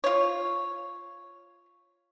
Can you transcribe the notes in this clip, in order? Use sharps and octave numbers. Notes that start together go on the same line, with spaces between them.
F4 C#5